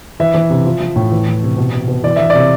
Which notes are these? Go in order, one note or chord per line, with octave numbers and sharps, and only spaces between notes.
E3 E5
E3
C3
F3
F3
A2
E3
E3
C3
B2
B2
B2
E3 D5
E3 E5
C3 D5